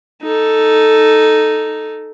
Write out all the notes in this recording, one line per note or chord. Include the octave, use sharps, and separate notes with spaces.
D#4 A4